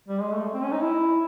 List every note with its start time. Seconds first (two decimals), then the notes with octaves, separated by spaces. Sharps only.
0.08 G3
0.20 G#3
0.32 A3
0.54 C4
0.63 C#4
0.72 D#4
0.81 E4